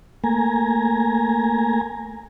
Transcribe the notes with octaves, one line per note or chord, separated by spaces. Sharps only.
A3 A#3 G#5 A#5